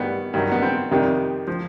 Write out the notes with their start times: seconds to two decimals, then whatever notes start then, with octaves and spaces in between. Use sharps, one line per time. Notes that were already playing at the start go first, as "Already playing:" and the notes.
Already playing: G2 D#3 G3 B3
0.33 G2 D#3 F#3
0.52 B3
0.62 C4
0.91 F2 C3 D#3 G3
1.48 F3